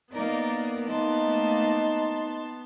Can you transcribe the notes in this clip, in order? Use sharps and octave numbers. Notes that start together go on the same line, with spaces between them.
A#3 B3 D#4 A#4 D5
A3 A#3 D#4 A5 C6